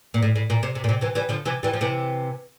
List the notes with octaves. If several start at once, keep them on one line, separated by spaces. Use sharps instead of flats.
A#2
A2
A2
A#2
C3
C3
A#2
C3
C3 E3
E3 G3
D3 F3
C3 E3
E3 G3
F3
C3 E3